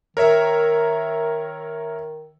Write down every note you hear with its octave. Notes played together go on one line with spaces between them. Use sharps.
D#3 A#4 C#5 E5